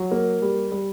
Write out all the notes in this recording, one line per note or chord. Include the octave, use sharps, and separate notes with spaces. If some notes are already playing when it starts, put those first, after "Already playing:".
Already playing: F#3
A#3
G3
G3